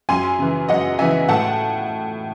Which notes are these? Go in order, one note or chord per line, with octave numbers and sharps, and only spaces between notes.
F#2 G#5 C6
C#3 E3
F#2 D#5 F#5
C#3 E3 E5 G#5
A2 F#5 A5